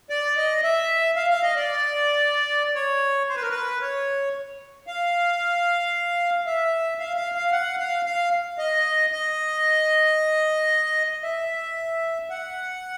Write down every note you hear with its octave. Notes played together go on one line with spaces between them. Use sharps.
D5
D#5
E5
F5
F5
D#5
D5
C#5
C5
B4
A#4
B4
C#5
F5
E5
F5
F5
F5
F#5
F5
F5
D#5
D#5
E5
F#5